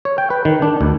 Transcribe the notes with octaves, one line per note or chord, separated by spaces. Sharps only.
C#5
G5
B4
D#3
D4
D2